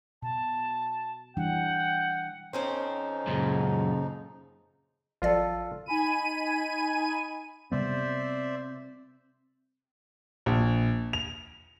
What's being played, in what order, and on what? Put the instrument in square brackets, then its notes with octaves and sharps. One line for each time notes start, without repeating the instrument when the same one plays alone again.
[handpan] B2 [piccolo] A5
[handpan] E3 G3 D4 [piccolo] F#5 [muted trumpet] G5
[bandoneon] F2 F3 D#4 [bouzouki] C4 C#4 C5
[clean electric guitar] F#2 A#2 [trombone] C#3
[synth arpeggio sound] G#1 F3 D5 [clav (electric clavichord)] F4 A4
[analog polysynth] D#4 G#5 B5 D#7
[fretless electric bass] C3 G3 B3 [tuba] C4 [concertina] C5 D5 E5
[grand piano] A#1
F7